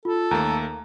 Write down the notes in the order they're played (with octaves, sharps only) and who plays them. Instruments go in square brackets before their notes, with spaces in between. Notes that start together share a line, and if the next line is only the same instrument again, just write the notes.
[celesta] F4 [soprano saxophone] A4
[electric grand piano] D#2 A3 A#3 [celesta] A#5